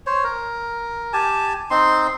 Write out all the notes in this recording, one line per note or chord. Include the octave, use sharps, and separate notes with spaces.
C5 C#5
A#4
G4 G#5 A5
C4 D#4 C6